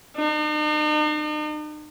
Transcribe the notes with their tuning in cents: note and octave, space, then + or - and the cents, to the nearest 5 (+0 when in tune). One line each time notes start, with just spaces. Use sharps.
D#4 -45